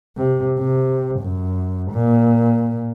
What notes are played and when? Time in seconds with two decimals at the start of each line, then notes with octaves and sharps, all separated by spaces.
0.17 C3
0.59 C3
1.21 F#2
1.92 A#2